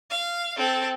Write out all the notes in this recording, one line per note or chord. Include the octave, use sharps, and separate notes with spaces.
F5
C4 A4